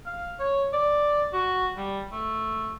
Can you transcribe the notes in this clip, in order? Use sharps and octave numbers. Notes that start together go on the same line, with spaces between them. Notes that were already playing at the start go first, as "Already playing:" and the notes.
F5
C#5
D5
F#4
G3
A3